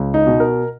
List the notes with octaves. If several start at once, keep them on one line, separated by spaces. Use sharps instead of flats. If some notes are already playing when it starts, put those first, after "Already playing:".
Already playing: C#2
D#4
B2
A#4